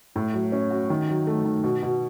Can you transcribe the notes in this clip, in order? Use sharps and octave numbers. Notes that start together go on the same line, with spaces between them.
A2
F#3
C#4
F#4
D#3
F#3
A3
D#3
B2
B2